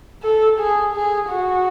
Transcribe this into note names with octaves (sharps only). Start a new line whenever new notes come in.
A4
G#4
G#4
F#4